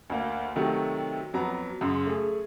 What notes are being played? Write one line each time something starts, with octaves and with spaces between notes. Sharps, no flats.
D2 A#3
C3 D#3 F#3 A3
F2 F#3 B3 A#5
F#2 C#3 C6
A3 G#4